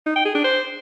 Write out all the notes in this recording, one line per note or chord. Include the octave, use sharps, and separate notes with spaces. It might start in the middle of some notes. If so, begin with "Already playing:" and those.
D#4
G5
G#4
D4
C5